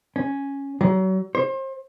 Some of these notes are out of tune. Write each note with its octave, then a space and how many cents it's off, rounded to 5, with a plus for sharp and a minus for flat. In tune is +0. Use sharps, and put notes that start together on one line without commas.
C#4 +0
F#3 +35
C5 +35